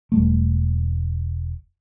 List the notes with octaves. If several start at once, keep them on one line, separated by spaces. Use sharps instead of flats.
E1 G3 A3